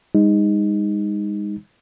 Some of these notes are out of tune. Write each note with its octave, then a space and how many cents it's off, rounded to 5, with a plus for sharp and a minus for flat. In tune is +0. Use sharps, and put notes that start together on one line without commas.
G#3 -40 D#4 +0